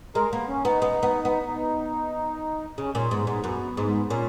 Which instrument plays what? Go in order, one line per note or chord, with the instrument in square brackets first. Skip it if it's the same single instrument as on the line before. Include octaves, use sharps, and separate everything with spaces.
[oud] G#3 [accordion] A#4
[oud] A#3 [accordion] B3
[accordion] C#4
[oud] B3 [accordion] D#4
[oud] B3
B3
B3
[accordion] D#4
[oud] C#3 [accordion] C#4
[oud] A#2 [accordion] C#4
[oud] G#2 [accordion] B3
[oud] G#2 [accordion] B3
[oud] F#2 [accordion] B3
[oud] G#2
[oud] A#2 [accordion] C#4